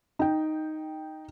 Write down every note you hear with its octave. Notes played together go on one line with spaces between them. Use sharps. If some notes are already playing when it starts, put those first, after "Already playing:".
D#4 G5